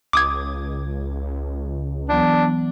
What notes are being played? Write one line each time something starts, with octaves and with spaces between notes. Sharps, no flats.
C#2 D6 D#6 G#6
E3 F#3 B3 D4